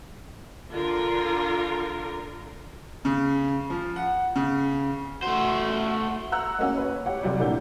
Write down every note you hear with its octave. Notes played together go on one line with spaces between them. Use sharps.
D3 F4 A#4
C#3
F3
F#5
C#3
A3 F#4 C5
F#5 A#5 E6 F#6
G#3 A#3 C#4 F#4
B4 C#5
G4 C#5 F#5
F2 C3 F#3 G3
A#2 A#3 D4 E4 F#4 G6